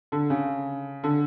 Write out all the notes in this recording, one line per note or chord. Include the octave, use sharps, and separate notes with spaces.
D3
C#3
D3